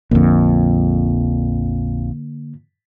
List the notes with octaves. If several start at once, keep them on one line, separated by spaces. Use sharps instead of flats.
A#1 F2 D3 A#3